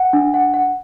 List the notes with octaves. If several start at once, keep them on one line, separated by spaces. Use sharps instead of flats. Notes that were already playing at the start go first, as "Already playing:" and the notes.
Already playing: F#5
D4
F#5
F#5